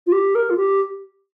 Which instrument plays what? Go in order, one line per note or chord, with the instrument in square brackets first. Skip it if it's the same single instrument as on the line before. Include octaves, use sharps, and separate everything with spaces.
[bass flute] F4
G4
A#4
F4
G4